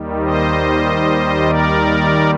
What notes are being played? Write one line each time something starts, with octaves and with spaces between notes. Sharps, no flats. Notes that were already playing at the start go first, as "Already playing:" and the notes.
Already playing: D#2 D#3 G3
C5 D#5
A#4 D5